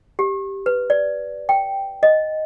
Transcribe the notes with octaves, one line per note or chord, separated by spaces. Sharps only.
G4
B4
D5
G5
D#5